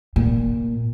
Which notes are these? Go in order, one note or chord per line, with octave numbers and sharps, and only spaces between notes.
A#2